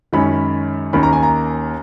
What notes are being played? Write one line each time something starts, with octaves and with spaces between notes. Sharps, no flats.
F#2 D#3 G#3 C#4 B5
D#2 D#3 A#3 C#4 B5
A#5
G#5
A#5